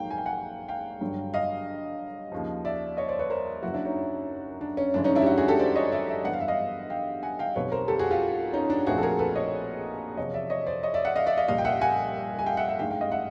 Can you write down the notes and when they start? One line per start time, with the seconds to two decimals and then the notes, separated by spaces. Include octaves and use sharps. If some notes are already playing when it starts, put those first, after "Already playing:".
Already playing: A#1 G#2 D#3 F#3 A#3 F5 G5
0.11 G#5
0.18 G5
0.26 F#5 G#5
0.69 F5 G5
1.01 G1 G2 D3 F#3
1.34 D#5 F5
2.32 D#2 C#3 F3
2.65 D5 E5
2.97 C#5 D#5
3.09 C5 D5
3.19 B4 C#5
3.30 A#4 C5
3.62 F#1 F#2 C#3 F#3 E4 F#4
3.73 D4 E4
3.85 C#4 D#4
4.61 D4
4.77 C#4
4.94 G1 F#2 C#3 E3 G#3 D4
5.04 C#4 D#4
5.15 D4 E4
5.22 G4
5.26 E4 F#4
5.38 F#4 G#4
5.48 G4 A4
5.59 C5 D5
5.76 C#5 D#5
5.92 D5 E5
6.08 D5 E5
6.24 G2 E3 G3 B3 F#5
6.33 F5
6.40 E5
6.48 D#5 F5
6.90 F5 G5
7.23 F#5 G#5
7.39 F5 G5
7.56 B1 B2 G3 C4 B4 C#5
7.72 A#4 C5
7.88 G4 A4
7.99 F#4 G#4
8.11 F4 G4
8.53 C#4 D#4
8.70 D4
8.87 A#1 A#2 F3 A3 C4 F#4 G#4
8.98 A4
9.03 G#4 A#4
9.19 A4 B4
9.36 C#5 D#5
10.17 E2 C3 F3 C#5 D#5
10.34 D5 E5
10.50 C#5 D#5
10.67 C5 D5
10.83 C#5 D#5
10.94 D5 E5
11.05 E5 F#5
11.16 D#5 F5
11.27 D5 E5
11.37 D#5 F5
11.48 C2 A#2 G3 D#5 F5
11.58 G5
11.65 E5 F#5
11.81 F#5 G#5
12.39 G#5
12.46 F5 G5
12.57 E5 F#5
12.68 E5 F#5
12.79 A1 G2 D#3 G#3 F5 G5
12.90 F5 G5
13.01 D#5 F5
13.12 E5 F#5